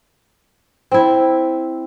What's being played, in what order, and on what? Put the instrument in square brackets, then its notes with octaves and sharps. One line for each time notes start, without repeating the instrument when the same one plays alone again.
[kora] C4 E4